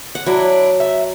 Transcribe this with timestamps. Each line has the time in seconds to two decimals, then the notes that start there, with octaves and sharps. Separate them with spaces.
0.15 F#5
0.26 F#3 D4 E4
0.80 E5